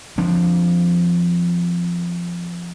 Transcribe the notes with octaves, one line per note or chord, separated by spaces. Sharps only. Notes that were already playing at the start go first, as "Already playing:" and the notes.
F3 C4 D4